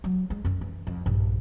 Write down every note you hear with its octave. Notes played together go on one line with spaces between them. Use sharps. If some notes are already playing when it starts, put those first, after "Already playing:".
F#3
G#3
F#2 C#4
E3
F2
A#1 G2